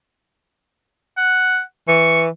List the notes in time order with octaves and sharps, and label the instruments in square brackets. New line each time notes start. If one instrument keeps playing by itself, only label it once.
[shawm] F#5
[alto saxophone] E3 [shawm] C#6